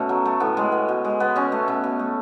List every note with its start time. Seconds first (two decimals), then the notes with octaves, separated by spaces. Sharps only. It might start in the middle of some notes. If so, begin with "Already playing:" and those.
Already playing: B2 A3 C#4
0.09 F#3
0.25 A3
0.40 A2 B3
0.57 G#3
0.72 B3
0.88 B2
1.05 G#3
1.20 B3
1.36 B2 C#4
1.52 A3
1.68 B2
1.84 B2
1.99 A3